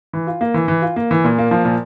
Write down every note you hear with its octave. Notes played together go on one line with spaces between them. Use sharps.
E3
F4
A#3
E3
E3
F4
A#3
E3
A#2
A#3
F3
A#2